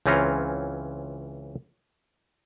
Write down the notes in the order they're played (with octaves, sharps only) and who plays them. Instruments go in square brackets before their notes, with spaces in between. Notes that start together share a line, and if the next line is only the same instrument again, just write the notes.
[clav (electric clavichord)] C#2 E3 C4 C#4 F4 A#5